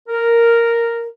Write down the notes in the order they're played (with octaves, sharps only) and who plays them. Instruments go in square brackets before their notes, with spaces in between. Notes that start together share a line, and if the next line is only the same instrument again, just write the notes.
[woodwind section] A#4